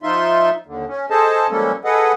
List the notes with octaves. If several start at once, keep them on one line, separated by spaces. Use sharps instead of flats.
F3 D#4 F4 E5 C6
D#2 D3
C#4
G#4 A4 C5 D#5 A5
F3 G3 G#3 A#3 C#4 A4
G#4 A4 B4 D#5 F#5